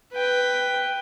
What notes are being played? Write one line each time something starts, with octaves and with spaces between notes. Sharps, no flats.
B4 G5